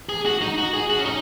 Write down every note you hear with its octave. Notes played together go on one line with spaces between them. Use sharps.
G#4
F#4
D#4
F#4
G#4
F#4
C#4
D#4